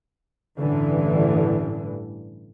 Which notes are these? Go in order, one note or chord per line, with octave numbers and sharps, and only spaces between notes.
A1 G2 D3 E3